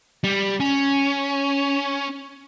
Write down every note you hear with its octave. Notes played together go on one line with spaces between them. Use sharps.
G3
C#4